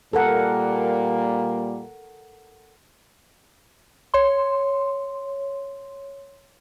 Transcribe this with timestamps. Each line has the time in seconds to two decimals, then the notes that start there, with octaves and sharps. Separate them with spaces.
0.13 A#2 G3 A#3 A4 A#4 F#5
4.14 C#5 C6